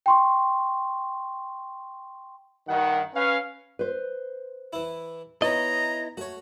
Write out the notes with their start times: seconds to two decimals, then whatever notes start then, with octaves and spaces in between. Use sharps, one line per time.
0.06 G5 C6 C#6
2.68 G2 D#3 F#5
3.15 C#4 B4 F5
3.79 B4 C5
4.73 E3 E4
5.42 B3 D#4 E4 C#5 D#5 A#5
6.17 A3 F#4 C#5